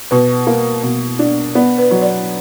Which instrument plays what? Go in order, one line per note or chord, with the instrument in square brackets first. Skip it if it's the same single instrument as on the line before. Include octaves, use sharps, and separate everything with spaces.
[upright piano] B2 [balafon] B4
[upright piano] A#3
B2
D4
[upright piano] B3 [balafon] D5
[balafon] B4
[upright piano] F#3
[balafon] D5